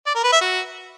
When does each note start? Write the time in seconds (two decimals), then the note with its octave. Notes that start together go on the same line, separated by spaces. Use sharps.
0.06 D5
0.15 A#4
0.24 B4
0.32 E5
0.41 F#4